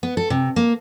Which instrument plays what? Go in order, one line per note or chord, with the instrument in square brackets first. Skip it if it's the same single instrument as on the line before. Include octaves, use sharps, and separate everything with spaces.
[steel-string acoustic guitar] B3
A4
C3
A#3